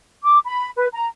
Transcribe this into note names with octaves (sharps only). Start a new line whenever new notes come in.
D6
B5
B4
A#5